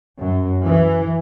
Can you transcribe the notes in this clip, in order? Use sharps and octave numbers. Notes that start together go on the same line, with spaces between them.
F#2
E3